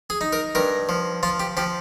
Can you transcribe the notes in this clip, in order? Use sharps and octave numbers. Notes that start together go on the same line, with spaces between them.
G#4
D#4
A#4
G2 A#4
F3
F3 F4
G4
F3 G4